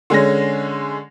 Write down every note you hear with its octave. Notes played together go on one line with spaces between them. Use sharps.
D3 G#3 C#4 A#6